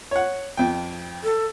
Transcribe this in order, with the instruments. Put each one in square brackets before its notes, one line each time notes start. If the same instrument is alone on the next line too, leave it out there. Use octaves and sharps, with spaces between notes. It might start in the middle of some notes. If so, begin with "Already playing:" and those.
[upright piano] C#5 F#5
F2 G5
[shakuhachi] A4